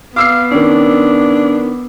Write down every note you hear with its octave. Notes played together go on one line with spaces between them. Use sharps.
B3 F5 D6 E6 C7
D#3 C#4 D4